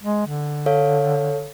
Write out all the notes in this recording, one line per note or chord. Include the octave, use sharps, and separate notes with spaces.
G#3
D3
A4 C#5 F5